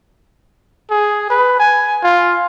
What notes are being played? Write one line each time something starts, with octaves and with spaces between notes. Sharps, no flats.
G#4
B4
G#5
F4